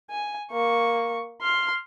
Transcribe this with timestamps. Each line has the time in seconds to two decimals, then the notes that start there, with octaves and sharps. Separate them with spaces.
0.10 G#5
0.51 A#3 C#6
1.42 C6 F6